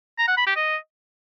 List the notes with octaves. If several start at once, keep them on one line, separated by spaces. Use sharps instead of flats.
A#5
F#5
B5
G4
D#5